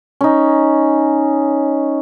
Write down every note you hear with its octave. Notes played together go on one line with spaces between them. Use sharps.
C#4 D#4